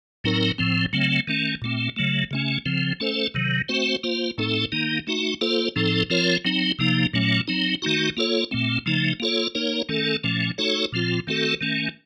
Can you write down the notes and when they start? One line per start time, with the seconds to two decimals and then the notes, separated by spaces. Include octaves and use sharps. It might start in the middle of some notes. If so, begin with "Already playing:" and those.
0.24 A2 F#3 C4 D#4 A#4
0.58 A2 F3 C4
0.93 C#3 F#3 A3 C4
1.28 D#3 A3 C#4
1.62 A#2 A3 C4
1.96 C#3 F#3 A3
2.31 C#3 A3 C#4
2.66 C#3 F3 C4
3.00 A3 C#4 A4 C5
3.34 C3 D#3 F#3
3.69 A3 C4 F#4 C5
4.04 A#3 F4 C5
4.38 A2 A3 C4 D#4 A4
4.72 D#3 A#3 D#4
5.07 A3 D#4 F#4
5.41 A#3 F4 A4 C5
5.76 A2 F3 C4 D#4 A4
6.10 F3 C4 F4 A#4 C#5
6.45 F#3 C4 D#4
6.79 C3 F3 A#3 D#4
7.13 A#2 F#3 A3 C#4
7.48 F#3 C4 D#4
7.82 D#3 A3 D#4 F#4
8.17 A#3 F4 A4 C#5
8.51 A#2 A3 C4
8.86 C#3 F3 A3 D#4
9.20 A#3 F4 A4 C#5
9.55 A#3 D#4 A#4 C#5
9.89 D#3 A3 C#4 A4
10.24 A#2 F3 A3 C#4
10.58 A3 D#4 F#4 A4 C#5
10.92 A#2 F3 C4 F4
11.27 D#3 A3 C4 F#4 A4
11.61 D#3 A3 C#4